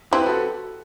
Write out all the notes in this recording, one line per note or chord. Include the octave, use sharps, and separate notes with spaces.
C4 E4 G4 B4
F#4 A4